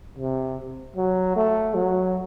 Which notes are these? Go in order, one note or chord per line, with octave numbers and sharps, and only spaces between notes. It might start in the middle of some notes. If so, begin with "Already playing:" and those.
C3
F#3
A3
F#3